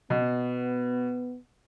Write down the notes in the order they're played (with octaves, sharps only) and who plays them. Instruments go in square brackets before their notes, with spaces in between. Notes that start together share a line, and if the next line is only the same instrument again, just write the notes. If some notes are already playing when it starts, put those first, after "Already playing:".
[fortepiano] B2 [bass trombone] B3